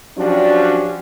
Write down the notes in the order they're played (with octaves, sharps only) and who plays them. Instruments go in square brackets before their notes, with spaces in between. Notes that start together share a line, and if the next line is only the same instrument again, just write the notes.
[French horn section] F3 F#3 C#4 D4 F#4 G4